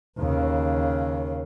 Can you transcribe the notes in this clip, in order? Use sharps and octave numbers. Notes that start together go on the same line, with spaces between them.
D#2 C#3